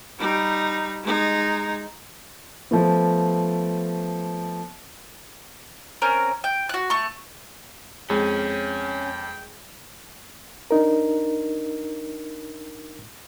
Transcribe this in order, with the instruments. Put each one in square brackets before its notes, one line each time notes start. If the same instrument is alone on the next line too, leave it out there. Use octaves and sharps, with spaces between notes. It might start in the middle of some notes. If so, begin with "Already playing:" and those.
[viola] G3 D#4
G#3 D#4
[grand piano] F3 A3 B3
[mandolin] C4 C#4 A#4
G5
F#4 F#6
A3 C#6
[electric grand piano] F2 [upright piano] G#3 [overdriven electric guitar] C#4 [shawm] G5
[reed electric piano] D4 D#4 A#4